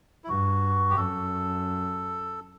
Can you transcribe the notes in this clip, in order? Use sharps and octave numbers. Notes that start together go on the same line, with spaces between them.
E4
G2 F#4
G4
F#2 A4